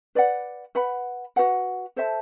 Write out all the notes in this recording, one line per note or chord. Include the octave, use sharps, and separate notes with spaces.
B4 D5 F#5
B4 F#5 B5
F#4 B4 F#5
A4 C5 E5 A5